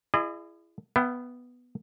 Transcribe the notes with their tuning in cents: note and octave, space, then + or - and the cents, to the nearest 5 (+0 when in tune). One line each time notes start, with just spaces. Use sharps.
E4 +30 G#4 +0 D#5 -40
B3 +0 E5 +35 G5 -15